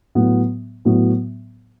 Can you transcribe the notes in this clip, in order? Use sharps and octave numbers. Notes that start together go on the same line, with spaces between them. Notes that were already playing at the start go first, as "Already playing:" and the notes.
A2 F#3 B3
A2 F#3 B3